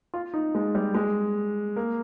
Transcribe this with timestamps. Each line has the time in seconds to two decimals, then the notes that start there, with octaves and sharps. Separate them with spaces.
0.14 F4
0.34 D#4
0.55 G#3
0.75 G3
0.94 G#3
1.76 A#3